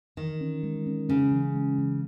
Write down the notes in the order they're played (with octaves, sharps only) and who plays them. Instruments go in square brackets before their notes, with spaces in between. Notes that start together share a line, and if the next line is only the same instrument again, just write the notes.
[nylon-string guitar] D#3 [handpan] E3
[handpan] C#4
G#3
C#4
[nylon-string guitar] C#3 [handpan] C#4
[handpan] E3
G#3
E3